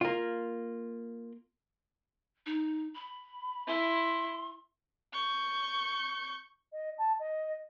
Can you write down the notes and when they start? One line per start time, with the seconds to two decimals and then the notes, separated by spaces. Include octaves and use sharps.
0.01 A#3 F4
2.46 D#4
2.94 B5
3.67 E4 C6
5.13 C#6 G6
6.72 D#5
6.98 A5
7.19 D#5